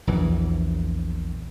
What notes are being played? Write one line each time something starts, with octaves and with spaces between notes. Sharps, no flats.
A#1 E2 E3